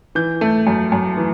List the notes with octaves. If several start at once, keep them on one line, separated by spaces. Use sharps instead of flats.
E3 G6
A3
F#2
F#2
E3